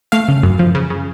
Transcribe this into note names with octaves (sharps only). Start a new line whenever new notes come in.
A3 F5
C#3
F#2
F3
C#3
C#3